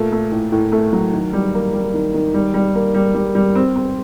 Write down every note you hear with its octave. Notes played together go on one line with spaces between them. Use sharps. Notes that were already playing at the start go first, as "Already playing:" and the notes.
Already playing: A#2 A3
A3
A2
A2
A3
F#3
D#3
G3
A#3
G3
D#3
D#3
G3
G3
A#3
G3
G3
G3
C4
C4